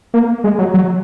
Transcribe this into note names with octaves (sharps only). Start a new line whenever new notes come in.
A#3
G#3
F#3
F#3